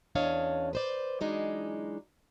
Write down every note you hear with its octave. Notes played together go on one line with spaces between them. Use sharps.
E2 C#4 D4 C#5 D#5 F5
B4 C5 D5
E3 F#3 G#3 D4 D#4